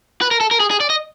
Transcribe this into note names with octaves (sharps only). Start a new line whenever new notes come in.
B4
A#4
A4
A#4
G#4
G#4
D5
D#5